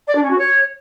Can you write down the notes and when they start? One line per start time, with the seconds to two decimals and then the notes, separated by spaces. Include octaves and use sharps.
0.08 D5
0.15 D4
0.23 C#4
0.30 F#4
0.38 C#5